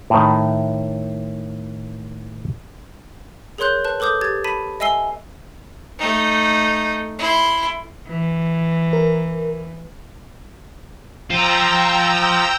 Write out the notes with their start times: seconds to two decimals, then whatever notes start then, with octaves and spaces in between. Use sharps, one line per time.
0.10 A2 D#3
3.58 G#4 A#4 C#5 C6 F#6 G6
3.85 B4 A5 F#6
4.00 A4 B4 D6 D#6 G6
4.21 G4 G#6 A6
4.44 A5 B5 B6 D#7
4.80 D#5 E5 G#5 E6 C7 G7
5.98 A3 D#4
7.19 E4 C6
8.08 E3
8.93 A#4
11.30 F4 C5 G5 A#5 E6